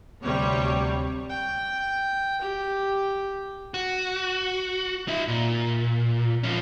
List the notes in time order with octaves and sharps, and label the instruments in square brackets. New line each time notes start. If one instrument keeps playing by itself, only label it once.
[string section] D2 C3 G3 C#5
[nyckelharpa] G5
G4
[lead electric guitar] F#4
D#4 E5
A#2
F3 C#4